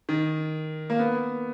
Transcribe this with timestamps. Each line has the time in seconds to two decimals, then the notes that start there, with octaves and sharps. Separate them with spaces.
0.09 D#3
0.90 A#3
0.99 B3